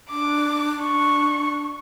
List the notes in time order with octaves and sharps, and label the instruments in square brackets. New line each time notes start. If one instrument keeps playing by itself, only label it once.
[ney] D4 [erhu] D6
[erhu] C#6